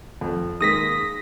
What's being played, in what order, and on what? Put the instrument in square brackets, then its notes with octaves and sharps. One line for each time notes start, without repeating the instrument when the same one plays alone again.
[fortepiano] F2
[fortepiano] D#3 G#3 A#3 [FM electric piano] D#6 A#6 B6